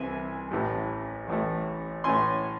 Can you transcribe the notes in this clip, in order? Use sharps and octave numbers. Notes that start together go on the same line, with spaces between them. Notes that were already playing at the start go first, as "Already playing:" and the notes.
Already playing: C2 C3 E3 G#5
A1 A2 E3 A3
A1 A2 E3 A3
A2 E3 A3 C#4 E4 G#5 C6